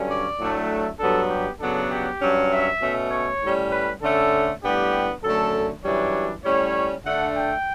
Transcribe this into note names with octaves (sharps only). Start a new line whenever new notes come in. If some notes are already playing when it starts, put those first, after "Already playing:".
Already playing: G2 D3 F#3 C#4
D5
A2 F#3 A3 D4
E5
G2 F#3 B3 D4 A4
G4
C#3 F#3 B3 D4 A4
G4
G2 F#3 C#4
E5
B2 A3 C#4
C#5
A2 G3 C#4
B4
D3 A3 C#4 A4
A2 G3 B3 D4 G4
F#2 D3 A3 A4
F#2 E3 G3 D4 C#5
A2 G3 C#4 C#5
D3 A3 D4 F#5
G5